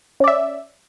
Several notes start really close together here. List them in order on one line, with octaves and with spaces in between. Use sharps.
C#4 D5 E5